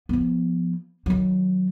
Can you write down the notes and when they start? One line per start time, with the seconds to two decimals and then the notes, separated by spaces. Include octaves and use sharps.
0.09 F3 B3
1.06 D#3 F#3